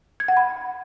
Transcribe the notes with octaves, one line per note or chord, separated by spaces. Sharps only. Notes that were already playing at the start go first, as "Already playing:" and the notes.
G#6
F#5
B5